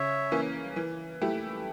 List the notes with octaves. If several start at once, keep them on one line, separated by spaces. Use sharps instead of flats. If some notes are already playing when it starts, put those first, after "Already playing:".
Already playing: C#3 C#5 E5
E3 A#3 C#4
E3
A3 E4 G4